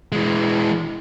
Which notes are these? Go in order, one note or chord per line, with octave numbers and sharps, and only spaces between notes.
E3 G#3